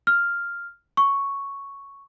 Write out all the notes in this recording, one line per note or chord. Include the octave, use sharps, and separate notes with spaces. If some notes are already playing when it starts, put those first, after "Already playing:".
F6
C#6